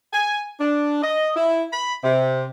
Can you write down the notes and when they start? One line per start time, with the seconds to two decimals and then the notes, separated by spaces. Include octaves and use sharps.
0.13 G#5
0.60 D4
1.03 D#5
1.36 E4
1.72 B5
2.04 C3